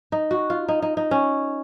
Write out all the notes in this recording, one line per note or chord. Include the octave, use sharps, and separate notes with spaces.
D#4
F#4
F4
D#4
D#4
D#4
C#4